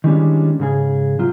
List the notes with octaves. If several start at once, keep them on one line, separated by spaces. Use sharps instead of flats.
D#3 E3 G3 G#3 C#4 D4
G#2 C#3 G#4
C3 F#3 F4